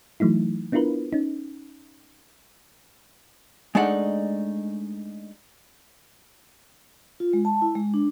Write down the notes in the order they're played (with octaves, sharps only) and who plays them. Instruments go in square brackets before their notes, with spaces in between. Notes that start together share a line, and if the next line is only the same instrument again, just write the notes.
[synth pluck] E3 F#3 A3 D#4 E4
B3 D4 E4 F4 A#4 B4
C#4 D#4
[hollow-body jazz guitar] G#3 A3 D4 D#4 D5 F#5
[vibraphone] F4
G#3
A5
E4
G#3
D4